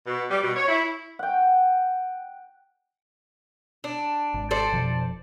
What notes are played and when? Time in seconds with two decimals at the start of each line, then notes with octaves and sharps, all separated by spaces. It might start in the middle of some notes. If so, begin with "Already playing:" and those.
0.06 B2
0.30 G3
0.42 B2
0.56 C#5
0.68 E4
1.19 F#5 G5
3.84 D4
4.34 G#1
4.51 A4 C5 D5
4.72 F1 B2 F3